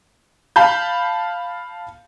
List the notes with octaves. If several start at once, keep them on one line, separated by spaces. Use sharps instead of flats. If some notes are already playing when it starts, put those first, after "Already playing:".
F5 A5 B5 G6